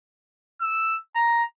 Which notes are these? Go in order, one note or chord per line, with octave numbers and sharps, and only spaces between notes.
E6
A#5